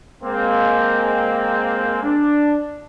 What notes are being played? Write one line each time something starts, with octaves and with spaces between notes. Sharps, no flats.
G#3 A#3 C4
D4